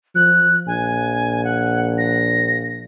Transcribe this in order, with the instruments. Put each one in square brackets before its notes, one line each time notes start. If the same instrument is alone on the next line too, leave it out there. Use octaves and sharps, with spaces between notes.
[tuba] F3 [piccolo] F#6
[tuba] A#1 [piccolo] G#5
[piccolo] F#5
A#6